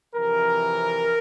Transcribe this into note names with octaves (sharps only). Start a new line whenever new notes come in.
F2 C3 E3 A#4